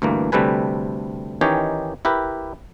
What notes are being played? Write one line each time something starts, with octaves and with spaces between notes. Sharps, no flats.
D2 G2 E3 A#3
D2 C3 G3 A4 B4 G#5
D#3 E3 C#4 D#4 G4 C#5
E4 G4 A#4 B4